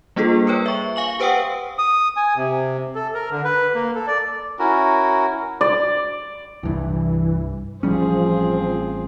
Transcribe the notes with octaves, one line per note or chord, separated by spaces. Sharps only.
G3 A#3 D4 F4 G#4 A4
A#4 B4 C#5 G5
E5 C#6
F5 G#5 C#6 F#7
G4 B4 C5 F#5 G5 D#6
D#6
G#5
C3
A4
A#4
D3
B4
A#3
A4
D5
C#4 E4 F#4 A#4
D5
C2 G2 E3
A1 F3 G3 C4 C#4 G#4